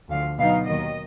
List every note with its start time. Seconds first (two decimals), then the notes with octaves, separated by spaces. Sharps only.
0.10 D2 D3 F3 F5
0.39 B2 F#3 B3 D#4 F5
0.66 D#2 D#3 F#3 A#3 D#5